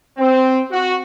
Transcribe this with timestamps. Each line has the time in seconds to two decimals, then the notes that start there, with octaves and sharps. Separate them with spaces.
0.17 C4
0.71 F#4